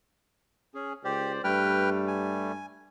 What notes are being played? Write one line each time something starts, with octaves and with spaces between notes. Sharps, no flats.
C#4 G#4
C#2 G4 C5 D5
G2 G3 A3 B4 G5 F6
G#5